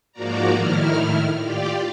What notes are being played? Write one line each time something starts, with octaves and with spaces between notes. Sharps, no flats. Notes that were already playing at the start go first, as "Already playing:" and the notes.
G#2 F3 A#3 F#4 D5 A#5
A2 D#3 E4 F6
F4 G4 D5